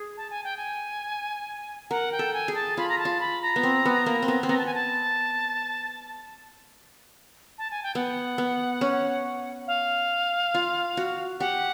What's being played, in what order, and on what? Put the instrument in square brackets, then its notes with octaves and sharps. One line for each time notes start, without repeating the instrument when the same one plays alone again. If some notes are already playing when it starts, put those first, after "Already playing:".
Already playing: [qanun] G#4
[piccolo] A5
G#5
G5
G#5
[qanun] A#4 [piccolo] F#5
[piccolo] G5
[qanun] A4
[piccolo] G#5
[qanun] G#4
[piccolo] A5
[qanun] F4 [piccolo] B5
[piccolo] A#5
A5
[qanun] F4
[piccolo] B5
A#5
[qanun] B3
C4
B3
A#3
C4
B3
C4
[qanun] B3 [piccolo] A#5
[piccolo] A5
G#5
A5
A5
G#5
G5
[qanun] B3 [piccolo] F#5
[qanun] B3
C#4
[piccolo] F5
[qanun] F4
F#4
[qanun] G4 [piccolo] F#5